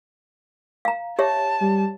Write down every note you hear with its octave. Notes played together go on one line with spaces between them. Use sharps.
F5 A#5
G4 C#5 E5 A5
G3